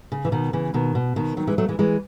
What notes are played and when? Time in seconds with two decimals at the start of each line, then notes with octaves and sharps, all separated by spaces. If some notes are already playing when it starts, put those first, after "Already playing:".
0.12 C#3
0.25 E3
0.32 B2 D#3
0.53 C#3 E3
0.74 B2 D#3
0.95 B2
1.16 B2 D#3
1.37 D#3 F#3
1.47 E3 G#3
1.58 F#3 A3
1.69 E3 G#3
1.79 E3 G#3